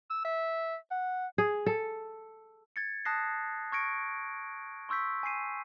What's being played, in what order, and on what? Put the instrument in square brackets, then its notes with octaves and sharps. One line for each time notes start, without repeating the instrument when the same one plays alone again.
[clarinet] E6
E5
F#5
[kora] G#4
A4
[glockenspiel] G#6 A6 C#7
A5 D#6 F#6 A#6 C7
C#6 F6 G#6 A#6 C#7 D7
C6 C#6 E6 G6 B6
G#5 E6 C7 D#7